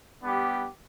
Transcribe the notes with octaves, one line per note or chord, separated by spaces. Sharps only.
G3 B3 D4 G4